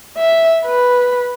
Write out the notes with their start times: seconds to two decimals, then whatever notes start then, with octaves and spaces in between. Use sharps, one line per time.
0.18 E5
0.66 B4